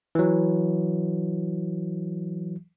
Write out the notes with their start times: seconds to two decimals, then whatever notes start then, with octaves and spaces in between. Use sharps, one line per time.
0.15 E3 F#3